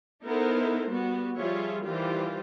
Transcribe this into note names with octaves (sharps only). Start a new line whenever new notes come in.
B3 D#4 E4 A4 A#4 C5
G3 B3 F#4
F3 G3 F4 G#4 C#5 E5
D#3 E3 G3 F4 G4 C5